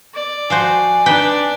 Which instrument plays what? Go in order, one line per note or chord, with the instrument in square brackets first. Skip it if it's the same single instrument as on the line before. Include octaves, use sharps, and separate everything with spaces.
[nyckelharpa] D5
[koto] F3 F#4 C5 [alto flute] G#5
[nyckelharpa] D4 D5 [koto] D#4 B4 G5